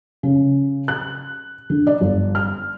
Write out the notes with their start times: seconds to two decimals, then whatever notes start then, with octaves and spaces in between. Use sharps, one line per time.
0.23 C#3
0.88 F#6
1.70 D3
1.87 D5
2.01 G1
2.35 F6